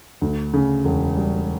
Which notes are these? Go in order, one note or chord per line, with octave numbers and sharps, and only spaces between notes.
D2
C#3
E1
G3